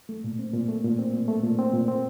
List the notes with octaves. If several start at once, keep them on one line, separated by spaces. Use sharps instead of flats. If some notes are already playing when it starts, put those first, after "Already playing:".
A3
A#2
C4
A#2
A3
A#2
C4
A#2
A3
A#2
C4
A#2
C4